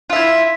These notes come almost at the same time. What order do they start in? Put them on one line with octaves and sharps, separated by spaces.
F4 E5 E4